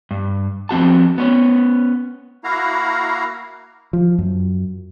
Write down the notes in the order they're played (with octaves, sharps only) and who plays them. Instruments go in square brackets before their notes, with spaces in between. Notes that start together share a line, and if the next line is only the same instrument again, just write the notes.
[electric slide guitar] G2
F3 C4 F#4 A5
B3 C#4
[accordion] A#3 E4 F#4 F5 A#5
[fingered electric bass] F3
F#2